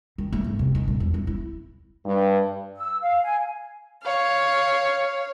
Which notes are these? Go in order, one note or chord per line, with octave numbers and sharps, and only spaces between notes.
D#3
A3
G#2
C3
D#3
A#1
E2
E3
E4
G2
E6
F5
G#5
C#5 F5